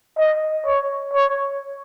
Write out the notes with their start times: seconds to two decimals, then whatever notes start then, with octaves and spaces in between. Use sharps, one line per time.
0.18 D#5
0.66 C#5
1.13 C#5